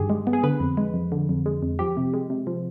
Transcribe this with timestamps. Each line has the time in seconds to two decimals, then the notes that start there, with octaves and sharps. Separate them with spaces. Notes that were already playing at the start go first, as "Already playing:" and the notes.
Already playing: G2 D#3 G4 G#4
0.10 G#3
0.27 B3
0.33 G#4
0.43 D3 B4
0.60 F2
0.77 G#3
0.94 F2
1.12 D3
1.29 F2
1.46 G#3
1.62 F2
1.79 F3 G4
1.97 C3
2.14 G#3
2.30 C3
2.47 F3